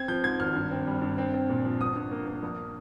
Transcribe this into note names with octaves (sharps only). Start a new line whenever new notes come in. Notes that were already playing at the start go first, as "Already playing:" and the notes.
Already playing: C4 G#6
F3 G6
G#2 G#6
G#1 F6
G2
C4
G3
G2
C4
C4
A#2
F3
G1 D#6
G2
A#3
A#3
A#1